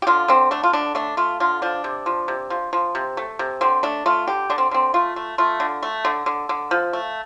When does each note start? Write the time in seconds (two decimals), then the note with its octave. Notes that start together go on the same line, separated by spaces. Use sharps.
0.02 G4
0.07 D3 F4
0.28 D3 C4
0.51 A3 D4
0.63 F4
0.73 D3 D4
0.95 A3 D4
1.17 A3 F4
1.40 D3 F4
1.62 F3 D4
1.84 C3
2.06 F3
2.28 C3
2.50 F3
2.73 F3
2.95 C3
3.17 A3
3.39 C3
3.61 D3 C4
3.83 A3 D4
4.06 A3 F4
4.27 D3 G4
4.50 D3 D4
4.58 C4
4.71 D3 C4
4.94 A3 F4
5.16 A3
5.38 A3 F4
5.60 D3
5.83 A3
6.05 D3
6.26 D3
6.49 D3
6.71 F3
6.93 A3